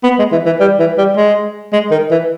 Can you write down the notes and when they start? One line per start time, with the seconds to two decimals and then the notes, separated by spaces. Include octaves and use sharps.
0.04 B3
0.19 G#3
0.32 E3
0.46 E3
0.60 G3
0.79 E3
0.98 G3
1.17 G#3
1.73 G#3
1.91 D#3
2.11 E3